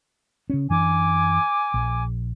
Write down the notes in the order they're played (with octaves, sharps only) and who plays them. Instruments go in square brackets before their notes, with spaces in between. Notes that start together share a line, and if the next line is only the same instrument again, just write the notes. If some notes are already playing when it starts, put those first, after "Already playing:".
[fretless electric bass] C#3 C#4
[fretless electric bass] F#2 E3 D4 [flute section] G#5 D6
[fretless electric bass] A#1